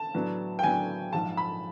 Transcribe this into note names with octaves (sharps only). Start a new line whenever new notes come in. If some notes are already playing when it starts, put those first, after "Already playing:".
Already playing: A5
A2 F#3 B3 D4
G5
A2 F#3 B3 D4 G#5
A#1 G#2 F3 A5
B5